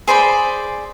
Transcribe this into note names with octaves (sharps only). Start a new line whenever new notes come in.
G#4 C5 D5 B5